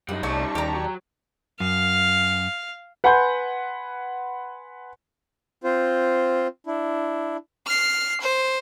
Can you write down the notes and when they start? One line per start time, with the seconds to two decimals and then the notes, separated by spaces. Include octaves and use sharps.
0.09 F#2 G3 D#4 F#5
0.23 C2 A3 C#4 E4 D5 A5 C#6
0.55 D#2 G4 A#5
0.75 F#3
1.60 F#2 F5
3.04 B4 F#5 G#5 B5 C6 G6
5.64 C4 F4 C5
6.67 D4 E4
7.66 F6 C7
8.21 C5